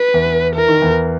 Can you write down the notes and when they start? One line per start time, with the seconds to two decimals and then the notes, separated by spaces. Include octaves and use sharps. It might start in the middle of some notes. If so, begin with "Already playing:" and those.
Already playing: B4
0.14 E2 E3
0.56 E3 A#4
0.68 D#3
0.81 E2 E3